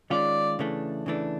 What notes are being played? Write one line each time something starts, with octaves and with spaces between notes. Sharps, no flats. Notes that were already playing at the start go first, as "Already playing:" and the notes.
D#3 G#3 C#4 F4 D5
C#3 E3 A3 D4
C#3 E3 A3 D4